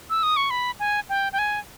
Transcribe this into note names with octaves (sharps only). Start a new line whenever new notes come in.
E6
D#6
C#6
B5
G#5
G5
G5
G#5